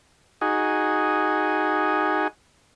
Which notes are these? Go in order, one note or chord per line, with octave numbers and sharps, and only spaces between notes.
D#4 F#4 G#4